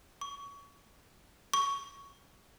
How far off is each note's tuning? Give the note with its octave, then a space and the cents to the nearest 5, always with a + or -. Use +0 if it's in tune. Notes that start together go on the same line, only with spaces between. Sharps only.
C#6 +25
C#6 +10